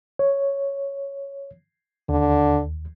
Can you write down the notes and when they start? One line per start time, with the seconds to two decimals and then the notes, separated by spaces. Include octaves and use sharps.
0.19 C#5
2.09 D#2 D3